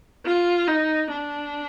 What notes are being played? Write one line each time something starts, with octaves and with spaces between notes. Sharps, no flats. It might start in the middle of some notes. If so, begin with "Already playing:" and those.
F4
D#4
D4